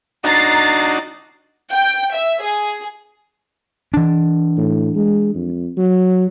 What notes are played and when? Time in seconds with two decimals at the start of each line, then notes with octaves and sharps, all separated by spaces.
0.24 D4 D#4 F#4 A#5 A6 C7
1.73 G5
2.14 E5
2.43 G#4
3.94 E3 D4
4.58 A2
4.95 G#3
5.34 F2
5.77 F#3